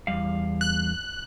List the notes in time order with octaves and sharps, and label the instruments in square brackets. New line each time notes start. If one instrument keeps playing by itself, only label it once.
[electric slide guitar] E2 G3 F5
[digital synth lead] F#6